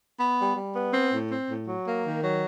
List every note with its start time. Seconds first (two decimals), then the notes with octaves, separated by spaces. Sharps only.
0.20 B3
0.39 G3
0.56 G3
0.75 B3
0.93 C4
1.12 A2
1.30 C4
1.49 A2
1.67 F#3
1.86 A#3
2.04 D#3
2.22 F#3